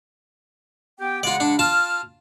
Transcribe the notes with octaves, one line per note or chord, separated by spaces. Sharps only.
B3 G4 G5
C#3 G#3 F4 D5 F#5
D4
F4 A5 F6